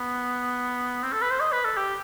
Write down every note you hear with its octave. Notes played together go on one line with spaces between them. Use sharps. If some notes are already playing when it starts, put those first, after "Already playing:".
Already playing: B3
C4
A4
B4
C5
D#5
B4
A4
G4